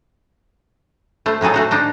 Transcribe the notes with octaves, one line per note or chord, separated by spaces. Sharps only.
A3 C5
A2 F#3 D#4 G#4 A4
A3 F#4 C5
D4 D#4 C5